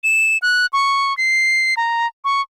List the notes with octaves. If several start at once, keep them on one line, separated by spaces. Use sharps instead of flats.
E7
F#6
C#6
C7
A#5
C#6